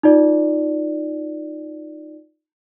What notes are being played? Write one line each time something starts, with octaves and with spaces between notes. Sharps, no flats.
D#4 F4 D5